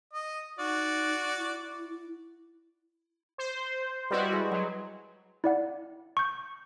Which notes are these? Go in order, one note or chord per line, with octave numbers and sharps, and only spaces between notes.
D#5
D#4 F#4 D5
E4
C5
G3 E4 F#4 B4 C5 D#5
G#3
F#3 C6
E4 D5 F#5
C#6 G6